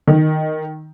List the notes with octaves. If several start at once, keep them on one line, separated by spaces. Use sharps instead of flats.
D#3